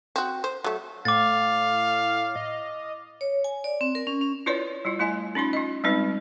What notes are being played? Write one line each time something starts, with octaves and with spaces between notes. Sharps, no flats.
C4 F#4
C5
F#3 A3
A2 F5 D6 A6
D#5
C#5
G#5
D5
C4
A#4
C#4
C#4
E4 F4 B4 C#5 D5
G3 E4 F4
A3 E4 D#5 G#5
C#4 D#4 F4 C6
F4 D#5
G3 G#3 C4 D#4 B4